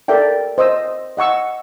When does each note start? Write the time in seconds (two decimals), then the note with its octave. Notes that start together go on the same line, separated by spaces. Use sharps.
0.08 A4 A#4 D5 E5 G5
0.58 C5 D#5 D#6 E6
1.17 D#5 F#5 C#6 E6